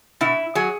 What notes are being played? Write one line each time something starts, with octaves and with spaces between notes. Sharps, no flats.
B2 E4
F#3 G#4